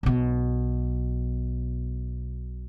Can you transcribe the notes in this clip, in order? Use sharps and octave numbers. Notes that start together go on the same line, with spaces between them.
B1 B2